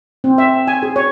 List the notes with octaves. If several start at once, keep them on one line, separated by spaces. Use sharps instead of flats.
C4
E5
G#5
G#4
C#5